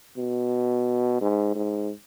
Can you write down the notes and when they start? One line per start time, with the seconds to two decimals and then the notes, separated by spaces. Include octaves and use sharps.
0.17 B2
1.21 G#2
1.55 G#2